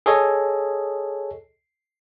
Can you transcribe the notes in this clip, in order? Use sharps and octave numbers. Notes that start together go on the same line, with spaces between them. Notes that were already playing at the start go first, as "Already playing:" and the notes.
G#4 A4 C#5 D#5